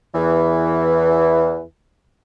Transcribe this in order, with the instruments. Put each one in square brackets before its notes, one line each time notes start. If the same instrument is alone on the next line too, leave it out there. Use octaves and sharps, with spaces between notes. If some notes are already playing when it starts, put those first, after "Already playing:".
[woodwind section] E2 E3